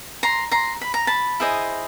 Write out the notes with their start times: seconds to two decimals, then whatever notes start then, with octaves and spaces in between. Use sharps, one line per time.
0.23 A#5 C6
0.51 A#5 C6
0.81 B5
0.94 A#5
1.07 A5 B5
1.40 E4 G#4 C5 D#5